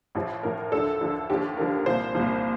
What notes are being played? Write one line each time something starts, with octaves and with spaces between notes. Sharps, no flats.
A1 A2 F3
A1 A2 F3 A#4
D2 D3 F3 A4
D2 D3 F3
D#2 D3 F3 G4
D#2 D3 F3 A#4
C2 A#2 F3 C5
C2 A#2 F3